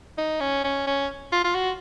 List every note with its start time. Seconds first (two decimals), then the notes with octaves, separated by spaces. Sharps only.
0.18 D#4
0.40 C#4
0.64 C#4
0.87 C#4
1.32 F4
1.44 F4
1.55 F#4